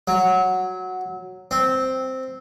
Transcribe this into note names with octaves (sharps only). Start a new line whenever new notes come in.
F#3
C4